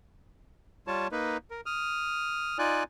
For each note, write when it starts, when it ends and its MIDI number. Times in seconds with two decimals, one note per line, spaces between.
0.87 1.08 55
0.87 1.08 65
0.87 1.08 73
0.87 1.08 81
1.12 1.37 58
1.12 1.37 63
1.12 1.37 71
1.51 1.61 70
1.66 2.58 87
1.66 2.58 89
2.59 2.83 63
2.59 2.83 65
2.59 2.83 74
2.59 2.83 80
2.59 2.83 90